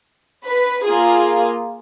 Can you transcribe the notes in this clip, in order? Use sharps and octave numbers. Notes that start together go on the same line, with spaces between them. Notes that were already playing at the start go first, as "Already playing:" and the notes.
B4
A#3 F4 G#4